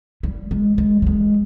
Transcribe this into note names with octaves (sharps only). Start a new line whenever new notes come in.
G3
G#3
G#3
G3
G#3